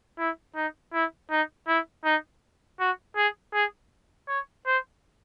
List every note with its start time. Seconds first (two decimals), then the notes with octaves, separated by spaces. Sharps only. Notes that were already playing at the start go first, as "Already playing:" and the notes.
0.19 E4
0.56 D#4
0.93 E4
1.31 D#4
1.68 E4
2.05 D#4
2.80 F#4
3.16 G#4
3.54 G#4
4.28 C#5
4.66 C5